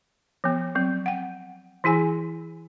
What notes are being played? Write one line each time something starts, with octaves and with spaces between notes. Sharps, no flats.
F3 B3
F#3 C4
F#5 G5
E3 E4 G#4 G#5